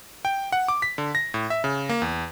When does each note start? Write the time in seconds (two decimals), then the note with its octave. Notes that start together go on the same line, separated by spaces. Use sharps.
0.25 G5
0.52 F#5
0.68 D6
0.82 B6
0.98 D3
1.15 A#6
1.34 A2
1.50 E5
1.64 C#3
1.89 A#3
2.02 E2